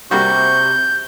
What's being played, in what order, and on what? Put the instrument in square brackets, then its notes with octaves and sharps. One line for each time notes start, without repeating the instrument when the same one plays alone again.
[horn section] C3 [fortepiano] G3 A#3 F#4 [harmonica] C#6 [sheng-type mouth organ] G6